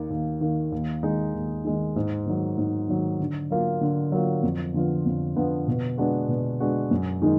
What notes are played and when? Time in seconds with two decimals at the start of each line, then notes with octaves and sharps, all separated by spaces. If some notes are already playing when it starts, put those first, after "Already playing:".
Already playing: D#2 D#3 A#3
0.10 D#2
0.41 D#3 A#3
0.72 D#2
1.03 D#3 G#3 D#4
1.34 D#2
1.65 D#3 G#3 D#4
1.96 G#2
2.26 D#3 F#3
2.58 G#2
2.89 D#3 F#3
3.20 D3
3.50 F#3 A#3 F4
3.81 D3
4.12 F#3 A#3 F4
4.43 F2
4.74 D3 F3 B3 F4
5.06 F2
5.36 D3 F3 B3 F4
5.68 B2
5.98 G#3 B3 D4 F#4
6.28 B2
6.60 G#3 B3 D4 F#4
6.91 F#2
7.22 D#3 G#3 D#4